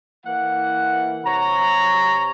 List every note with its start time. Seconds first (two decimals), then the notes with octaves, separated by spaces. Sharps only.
0.25 E3 A#3 F#5
1.25 C3 C#5 A#5